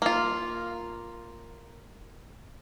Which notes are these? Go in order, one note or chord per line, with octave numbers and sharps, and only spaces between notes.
A#3 F4